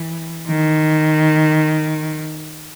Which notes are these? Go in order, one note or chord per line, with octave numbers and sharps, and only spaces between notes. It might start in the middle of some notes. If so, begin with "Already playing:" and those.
Already playing: E3
D#3